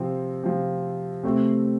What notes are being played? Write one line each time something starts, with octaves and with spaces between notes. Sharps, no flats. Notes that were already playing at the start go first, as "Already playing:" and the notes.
Already playing: C3 F3 C4
C3 F3 C4
C3 A3 C4